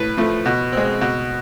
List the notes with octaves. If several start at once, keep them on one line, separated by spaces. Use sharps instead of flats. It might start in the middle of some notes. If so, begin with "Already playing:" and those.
Already playing: A2 B4
F3 A3
B2
G#3 C4
B2